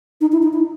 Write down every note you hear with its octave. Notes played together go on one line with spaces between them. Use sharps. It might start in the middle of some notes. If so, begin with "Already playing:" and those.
D#4
E4
D#4
E4